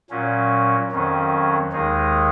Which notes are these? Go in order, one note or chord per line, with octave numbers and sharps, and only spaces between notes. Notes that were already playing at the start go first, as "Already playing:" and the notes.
A#2 F#3 C#4
F2 D#3 F#3 C#4
D#2 D#3 G#3 D#4 G#4